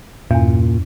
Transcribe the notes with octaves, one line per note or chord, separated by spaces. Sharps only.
E2 G2 A#2